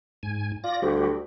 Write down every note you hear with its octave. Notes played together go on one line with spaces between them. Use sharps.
G#2 G#5
F4 D5 A#6
D2 G3 F#4 G4